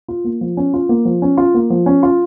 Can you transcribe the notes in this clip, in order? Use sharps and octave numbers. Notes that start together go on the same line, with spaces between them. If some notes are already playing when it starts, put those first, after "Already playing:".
F4
A#3
F3
C#4
F4
A#3
F3
C#4
F4
A#3
F3
C#4
F4